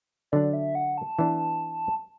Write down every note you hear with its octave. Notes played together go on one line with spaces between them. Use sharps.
D3 F#3 D4 D5
E5
F#5
A5
E3 B3 D4